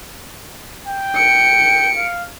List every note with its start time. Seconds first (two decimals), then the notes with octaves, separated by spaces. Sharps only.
0.87 G5
1.16 C#7 D7
1.96 F5